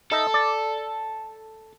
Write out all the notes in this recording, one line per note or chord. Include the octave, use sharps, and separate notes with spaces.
D#4 A4 D#5 E5
D5